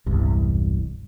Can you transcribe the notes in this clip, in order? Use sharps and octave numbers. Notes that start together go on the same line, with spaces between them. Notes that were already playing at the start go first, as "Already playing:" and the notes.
E1 C2 G2